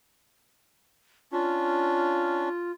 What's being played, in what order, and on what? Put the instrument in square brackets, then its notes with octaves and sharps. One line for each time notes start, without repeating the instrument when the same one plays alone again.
[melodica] C#4 D4 [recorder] F4